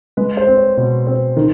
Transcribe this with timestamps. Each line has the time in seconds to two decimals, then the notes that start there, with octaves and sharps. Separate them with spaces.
0.17 G#3 B4
0.37 C5
0.47 C4
0.57 C#5
0.77 B2
1.07 C4
1.37 D#3